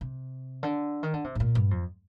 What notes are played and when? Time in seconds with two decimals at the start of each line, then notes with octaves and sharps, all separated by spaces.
0.01 C3
0.63 D3
1.03 D#3
1.14 D3
1.24 C3
1.35 G#2
1.40 A#2
1.55 G2
1.71 F2